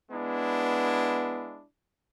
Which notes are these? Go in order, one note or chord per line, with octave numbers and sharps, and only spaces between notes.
G#3 B3 D4 E4